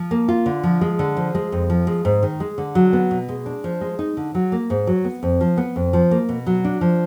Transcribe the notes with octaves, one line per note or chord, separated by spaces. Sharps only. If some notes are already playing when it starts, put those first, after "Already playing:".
Already playing: F3
A#3
F4
D3
F3
G#3
D3
F3
G#3
F2
F3
G#3
G#2
D#3
G#3
D3
F#3
B3
B2
G#3
D4
F3
G#3
D#4
D3
F#3
A#3
G#2
F#3
B3
F2
F3
B3
F2
F3
A#3
B2
F#3
D4
F3